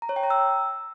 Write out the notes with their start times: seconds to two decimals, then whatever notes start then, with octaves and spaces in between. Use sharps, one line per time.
0.02 A#5
0.09 C#5
0.16 G5
0.23 A#5
0.30 E6